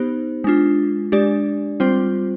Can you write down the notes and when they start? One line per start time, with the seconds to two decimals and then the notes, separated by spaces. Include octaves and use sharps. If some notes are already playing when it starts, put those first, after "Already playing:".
Already playing: B3 D#4 G4 C5
0.44 G#3 D4 F4
1.12 G#3 D4 G4 D5
1.80 G3 C4 F4 C5